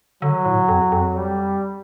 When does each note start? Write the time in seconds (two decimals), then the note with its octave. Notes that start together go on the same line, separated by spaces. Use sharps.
0.22 D3 F#3
0.45 A2
0.69 F2
0.92 F2
1.15 G3